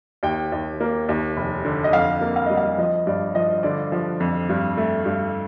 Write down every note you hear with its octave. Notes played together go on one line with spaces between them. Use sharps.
D#2 G5
D#2
A#3
D#2
F1
D3
D#5
F2 F5
A#3
F5
G3 D#5
F5
F3 D#5
G2 D5
F3 D#5
D3 D5
F3
F2
G2
A3
G2